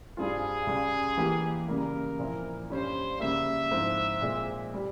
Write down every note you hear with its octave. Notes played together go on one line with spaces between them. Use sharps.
G2 G3 C4 F4 G#4
C#2 C#3 G3
E3 A#3 E4 G4
C#3 G3 A#3 A#4
A#2 F3 C4 E4
G2 G3 C#4 C5
C#3 G3 A#3 E5
G#2 F3 C4 E4
A#2 G#3 C4
G3